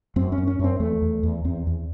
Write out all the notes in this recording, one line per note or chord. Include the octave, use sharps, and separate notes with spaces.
F#2 C4
C#4
F#2
C#4
F#2 C4
E2 A3
E2
E2
E2 C4
E2